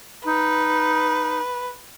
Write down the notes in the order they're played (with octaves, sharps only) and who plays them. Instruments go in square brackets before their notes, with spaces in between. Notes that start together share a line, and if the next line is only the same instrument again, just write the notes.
[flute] D#4 [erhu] B4